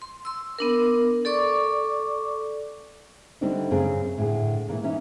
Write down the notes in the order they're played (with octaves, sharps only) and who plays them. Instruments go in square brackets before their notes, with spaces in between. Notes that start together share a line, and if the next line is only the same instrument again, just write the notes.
[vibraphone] C6
C6 E6
B3 D4 A#4
A4 D5 C#6 D6
[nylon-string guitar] D3 G3 A3 C4 D4 D#4
F#2 C#3 C4 G#4
A2 D3 G#4
A#2 D3 E3 A3
E3 C#4 D#4 E5